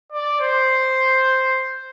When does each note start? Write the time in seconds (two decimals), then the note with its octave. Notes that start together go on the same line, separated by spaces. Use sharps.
0.12 D5
0.40 C5